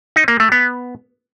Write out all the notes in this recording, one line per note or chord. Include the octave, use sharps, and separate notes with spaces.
D#4
A#3
A3
B3